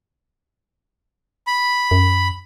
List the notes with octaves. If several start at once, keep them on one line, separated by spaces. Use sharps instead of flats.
B5
F#2